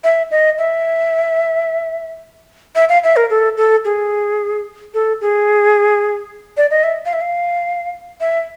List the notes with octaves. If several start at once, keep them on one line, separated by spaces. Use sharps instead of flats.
E5
D#5
E5
E5
F5
E5
A#4
A4
A4
G#4
A4
G#4
D5
D#5
E5
F5
E5
F5
E5